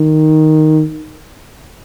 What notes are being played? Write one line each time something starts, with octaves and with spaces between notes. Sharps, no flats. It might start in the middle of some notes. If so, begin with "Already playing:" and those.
Already playing: D#3